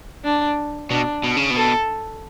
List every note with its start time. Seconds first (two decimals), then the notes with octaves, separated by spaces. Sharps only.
0.24 D4
0.90 B2 D4
1.24 B2
1.37 C#3
1.50 B2
1.56 A4